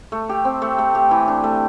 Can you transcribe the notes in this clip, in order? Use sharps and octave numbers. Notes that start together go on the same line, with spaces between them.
A3
G4
C4
A3
A3
G4
E3
D4
A3